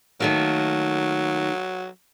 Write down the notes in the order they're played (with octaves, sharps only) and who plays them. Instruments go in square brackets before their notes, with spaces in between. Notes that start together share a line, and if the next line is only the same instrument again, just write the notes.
[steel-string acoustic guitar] D#3 A3 A#3 [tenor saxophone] F#3